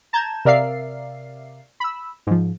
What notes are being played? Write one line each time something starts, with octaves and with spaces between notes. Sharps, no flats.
A5 A#5 G6 G#6 E7
C3 A#4 D5 E5 F5 C7
B5 E6
G#2 F3